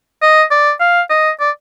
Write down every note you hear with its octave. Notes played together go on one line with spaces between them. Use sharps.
D#5
D5
F5
D#5
D5